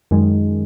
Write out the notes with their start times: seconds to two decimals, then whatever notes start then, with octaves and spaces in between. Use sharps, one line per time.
0.11 F#2 D#3 G#3